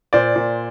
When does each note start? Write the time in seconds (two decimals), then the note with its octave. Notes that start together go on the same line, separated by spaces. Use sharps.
0.13 A#2 C5 D5
0.36 A#2